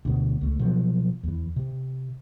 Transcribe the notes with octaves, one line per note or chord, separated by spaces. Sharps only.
D2 B2
C#2 A3
B2 F3 F#3
E2 E3
C3